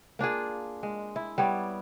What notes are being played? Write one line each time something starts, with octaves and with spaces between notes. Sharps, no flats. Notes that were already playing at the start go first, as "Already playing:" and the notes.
A#3 D4 F4 G#4
G#3
E4
G3 B3 C#5 D5